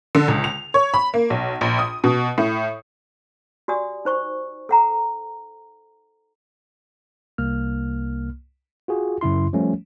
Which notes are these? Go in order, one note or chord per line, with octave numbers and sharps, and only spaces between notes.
D3
C#2
F7
C#5
B5
A#3
B1
A#1
D#6
B2
A2
F#4 G4 D5 G#5 D#6
D#4 C5 C#6
A4 F#5 A#5
C2 A#3 F6
F4 F#4 G#4
F#2 C#3 E4 C6
F3 G3 A3 C#4